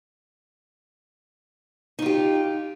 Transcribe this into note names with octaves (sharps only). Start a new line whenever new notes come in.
D#4 F4 G4